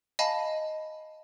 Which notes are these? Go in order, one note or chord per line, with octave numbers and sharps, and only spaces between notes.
D#5 F5 G#5 A5 B5